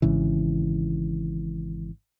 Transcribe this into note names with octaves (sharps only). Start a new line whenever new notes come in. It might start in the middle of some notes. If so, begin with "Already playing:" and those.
G#1 G#2 C#3 E3